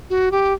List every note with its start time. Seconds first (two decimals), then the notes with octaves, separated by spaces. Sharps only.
0.10 F#4
0.32 G4